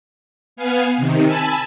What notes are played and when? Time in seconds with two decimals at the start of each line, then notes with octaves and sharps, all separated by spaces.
0.56 B3 F5 G#5
0.97 C3 D#3
1.27 G#5 A5 B5 E6